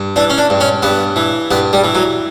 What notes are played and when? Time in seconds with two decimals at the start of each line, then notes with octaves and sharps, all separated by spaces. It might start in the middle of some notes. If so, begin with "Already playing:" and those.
Already playing: G2
0.16 E3 D4
0.30 C#4
0.38 D4
0.50 G2
0.60 C#4
0.83 G2 B3
1.16 E3
1.51 G2 B3
1.73 G3
1.84 E3
1.95 F#3